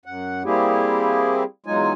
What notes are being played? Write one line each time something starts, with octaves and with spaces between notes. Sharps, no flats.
F#2 F#5
G3 A#3 C4 E4 G4 G#4
E2 F#3 G#3 D#4 F4 G#5